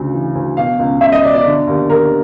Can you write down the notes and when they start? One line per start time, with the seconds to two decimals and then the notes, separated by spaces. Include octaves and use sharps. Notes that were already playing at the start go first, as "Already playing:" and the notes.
Already playing: D2 C#3
0.14 E3
0.35 D2
0.57 B2 F5
0.79 C#2
1.01 C#2 E5
1.12 D#5
1.23 B2 D5
1.34 D5
1.46 D3
1.68 D#2
1.90 D#2 A#4